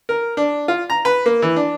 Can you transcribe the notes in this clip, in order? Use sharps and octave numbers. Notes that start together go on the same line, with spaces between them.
A#4
D4
F4
A#5
B4
A#3
E3
D4